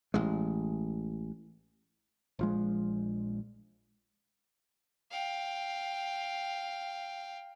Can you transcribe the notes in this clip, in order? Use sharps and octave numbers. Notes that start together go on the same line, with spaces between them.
A1 G#3
A#1 F3 G#3
F5 G5